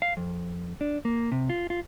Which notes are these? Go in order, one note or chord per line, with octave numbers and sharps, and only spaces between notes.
F5
F2
D4
A#3
C3
F4
F4